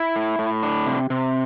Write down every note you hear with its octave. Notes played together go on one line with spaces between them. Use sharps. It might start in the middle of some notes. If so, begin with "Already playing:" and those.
Already playing: E4
A2
A2
D4
C3
C3